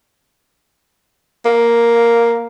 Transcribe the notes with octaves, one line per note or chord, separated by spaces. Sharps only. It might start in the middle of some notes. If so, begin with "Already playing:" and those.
A#3